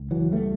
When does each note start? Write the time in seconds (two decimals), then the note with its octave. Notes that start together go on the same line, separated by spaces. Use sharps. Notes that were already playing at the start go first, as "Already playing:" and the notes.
Already playing: C#2
0.11 E3 F#3
0.32 G3 A3